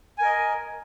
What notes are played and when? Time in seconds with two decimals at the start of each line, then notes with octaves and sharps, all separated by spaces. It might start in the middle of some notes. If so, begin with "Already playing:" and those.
0.18 G#5
0.22 A#4
0.25 D#5